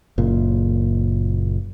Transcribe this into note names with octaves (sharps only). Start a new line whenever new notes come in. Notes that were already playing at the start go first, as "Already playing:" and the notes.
F#1 A#2